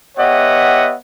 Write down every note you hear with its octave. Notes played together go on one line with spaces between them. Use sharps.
B3 G4 C#5 D#5 E5 F#5